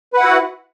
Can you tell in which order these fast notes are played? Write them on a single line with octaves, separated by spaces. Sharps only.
B4 F#5 E4 F#4